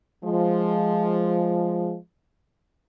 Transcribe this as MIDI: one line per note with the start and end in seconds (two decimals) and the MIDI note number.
0.24 1.97 53
0.24 1.97 56